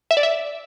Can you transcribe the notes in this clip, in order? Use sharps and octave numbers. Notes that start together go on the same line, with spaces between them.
E5
D5
E5